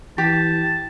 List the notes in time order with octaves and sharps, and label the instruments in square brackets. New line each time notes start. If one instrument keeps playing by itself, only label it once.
[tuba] E3 [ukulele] G4 [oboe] A5